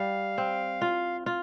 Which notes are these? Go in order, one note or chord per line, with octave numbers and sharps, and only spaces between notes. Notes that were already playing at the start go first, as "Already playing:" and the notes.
Already playing: G3 F5
C4
F4
F4